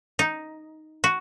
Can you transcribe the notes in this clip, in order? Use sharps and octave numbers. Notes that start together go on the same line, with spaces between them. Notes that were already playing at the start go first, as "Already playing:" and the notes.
D#4
F#4